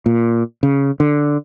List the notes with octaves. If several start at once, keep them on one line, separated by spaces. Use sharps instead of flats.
A#2
C#3
D3